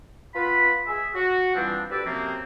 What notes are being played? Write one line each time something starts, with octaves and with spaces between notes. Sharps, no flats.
B3 F4 B4 B5
G#4 E5
F#4
E3 F3 G3 C4 D4
D2 G2 G4 B4 D5 E6
F#2 C3 F3 A#3 C4